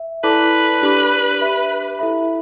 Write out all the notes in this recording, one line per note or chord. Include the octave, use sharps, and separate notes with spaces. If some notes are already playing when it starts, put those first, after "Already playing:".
Already playing: E5
E4 A4 B4 D5 A5 D6
D4 G4 D5 B5 D6
G4 E5 B5
E4 A4 E5 B5